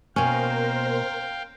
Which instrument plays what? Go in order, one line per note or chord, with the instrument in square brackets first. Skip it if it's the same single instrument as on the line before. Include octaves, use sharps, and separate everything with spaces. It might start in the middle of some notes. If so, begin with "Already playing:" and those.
[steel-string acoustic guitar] B2 A#3 [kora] C#4 [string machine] A#4 C5 [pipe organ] F5 G5